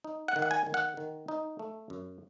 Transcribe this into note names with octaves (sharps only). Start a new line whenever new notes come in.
D#4
F#5
D#3
F#5
G#5
D#3
F#5
D#3
D#4
A3
F#2